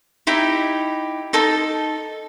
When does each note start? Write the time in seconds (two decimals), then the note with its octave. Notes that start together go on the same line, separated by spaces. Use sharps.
0.27 D#4 E4 G4
1.33 D#4 A4 A5